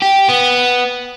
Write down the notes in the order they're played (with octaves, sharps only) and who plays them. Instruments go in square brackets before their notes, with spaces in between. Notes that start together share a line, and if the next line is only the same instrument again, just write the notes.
[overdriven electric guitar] G4
B3